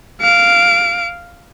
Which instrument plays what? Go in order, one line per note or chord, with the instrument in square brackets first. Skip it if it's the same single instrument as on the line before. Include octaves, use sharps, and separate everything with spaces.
[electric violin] F5 D7